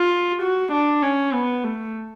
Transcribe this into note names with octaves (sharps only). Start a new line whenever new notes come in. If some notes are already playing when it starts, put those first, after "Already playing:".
Already playing: F4
F#4
D4
C#4
B3
A3